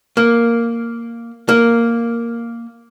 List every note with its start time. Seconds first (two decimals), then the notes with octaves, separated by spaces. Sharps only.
0.17 A#3
1.49 A#3